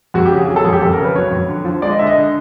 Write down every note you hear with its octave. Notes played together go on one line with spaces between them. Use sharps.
F2 F#4
G4
C#3
G#4
F#3 G#4
A4
F2 G#4
G4
F2 A4
C#3 A#4
B4
F#3 C#5
F2
D3
F3
G#3 D5
D#5
D3 E5
D#5
D3